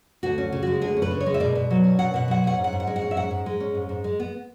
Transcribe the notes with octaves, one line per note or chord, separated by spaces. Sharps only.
D2 F#4
C#4
C#3
G#3 F#4
D2 G#4
C#4
B4
C#3
C#5
G#3
E5
B2 D5
B2
F#3
C#4
B2 F#5
B2 F#5
F#3 F#5
C#4 F#5
G#2
F#5
G#2
F#5
G#3
F#5
C#4
E5
G#2 F#5
G#2
G#3
C#4
G#2
G#2
G#3
B3